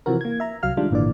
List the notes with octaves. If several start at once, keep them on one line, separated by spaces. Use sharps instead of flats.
C3 E3 F3 F#4 A#4
A#3 G#6
E5 A#5
C2 F#3 F5 F6
D#3 G3 G#3 D4 F4
G#1 A#2 D3 E3 D5